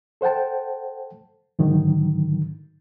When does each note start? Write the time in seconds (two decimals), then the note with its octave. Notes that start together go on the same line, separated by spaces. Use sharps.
0.21 A4 C5 F#5 G5 A5
1.59 G#2 D3 D#3 F#3